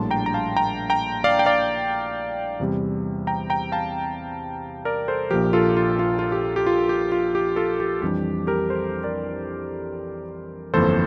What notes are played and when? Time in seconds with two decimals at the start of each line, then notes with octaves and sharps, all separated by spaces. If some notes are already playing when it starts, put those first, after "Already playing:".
Already playing: A#1 A2 G3 A#3 D4 A5 C6
0.11 G5 A#5
0.26 A#5
0.34 F5 A5
0.56 G5 A#5
0.90 G5 A#5
1.24 D5 F5
1.39 G5
1.46 D5 F5
2.60 E2 C3 G3
3.27 G5 A#5
3.50 G5 A#5
3.72 F5 A5
4.85 A#4 D5
5.08 A4 C5
5.31 A#1 A#2 F3 G4 A#4
5.53 F4 A4
5.77 F4
5.99 F4
6.19 F4
6.32 G4
6.56 G4
6.66 F4
6.89 G4
7.12 F4
7.35 G4
7.56 F4 A4
7.80 G4
8.02 F2 E3 G3 D4 G4
8.47 G4 A#4
8.70 A4 C5
9.04 A#4 D5
10.74 G1 F2 E3 A#3 A4 C5